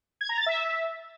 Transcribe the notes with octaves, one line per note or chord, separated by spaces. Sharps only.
G#6
A#5
A6
E5